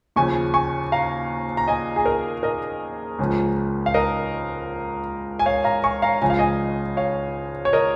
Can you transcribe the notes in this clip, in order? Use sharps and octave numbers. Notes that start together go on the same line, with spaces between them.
D#2 C#3 F3 G#5 C#6
G#5 C#6
F5 A#5
A#5
D#5 G#5
G#4
A#4
A#4 D#5
C#2 C#3 F3
F5
A#4 D#5
G#5
C#5 F5
F5 A#5
G#5 C#6
F5 A#5
C#2 C#3 F3 G#5
F5
D#5 G#5
C#5 F5
C#5
A#4 D#5